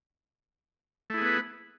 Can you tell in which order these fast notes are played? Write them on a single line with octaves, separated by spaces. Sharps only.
A3 E4 G#4 B3 B4